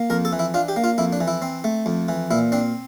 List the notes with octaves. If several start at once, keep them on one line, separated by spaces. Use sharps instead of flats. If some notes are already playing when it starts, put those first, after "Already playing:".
Already playing: A#3
F2 A#4
A4
E3
E4
D4 F4
G4
A#3
F4
F2 E4
D4
E3
E4
C4
A3
F2
E3
A#2 E4
C4 D4